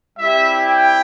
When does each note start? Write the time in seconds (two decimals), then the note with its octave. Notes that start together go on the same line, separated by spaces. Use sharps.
0.18 G3 C4 E4 G4 E5
0.68 G5